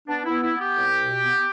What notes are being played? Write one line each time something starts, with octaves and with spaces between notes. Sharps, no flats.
B3 D4
E4
B3
E4
B3
G4
C2
B2
B3